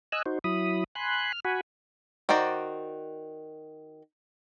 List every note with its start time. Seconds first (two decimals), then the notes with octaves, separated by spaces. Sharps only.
0.12 D#5 G#5 E6 F#6
0.26 D#4 F#4 C5
0.44 F#3 E4 B5 D#6
0.95 G#5 B5 C6 F#6
1.33 F6
1.45 F#4 F#5 G#5 B5
2.29 D#3 F#4 C5 D5